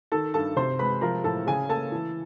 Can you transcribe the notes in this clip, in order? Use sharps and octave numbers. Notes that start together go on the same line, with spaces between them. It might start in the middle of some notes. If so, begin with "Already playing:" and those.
D#3 A4 A5
G2 A4 A5
C3 C5 C6
G#3 B4 B5
F3 A#4 A#5
A2 A4 A5
C#3 G#4 G#5
A#3 A4 A5
E3